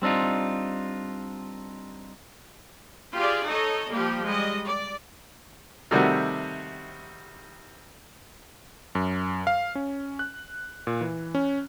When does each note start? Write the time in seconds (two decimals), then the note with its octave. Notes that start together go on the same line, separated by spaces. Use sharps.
0.02 G3 C4 D4 D#4 F4
3.15 F4 G4 G#4 D5
3.47 D#4 A4 C#5 D#5
3.90 F3 G3 A#3 G4
4.26 G3 G#3 D#5
4.64 D5
5.91 C3 D#3 G3 A3 C4 F#4
8.95 F#2
9.47 F5
9.75 C#4
10.19 F#6
10.87 A#2
11.01 E3
11.35 C#4